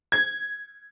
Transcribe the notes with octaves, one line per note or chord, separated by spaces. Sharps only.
G#6